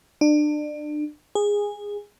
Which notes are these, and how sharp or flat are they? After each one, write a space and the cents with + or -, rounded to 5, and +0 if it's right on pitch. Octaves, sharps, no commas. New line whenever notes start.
D4 +30
G#4 -15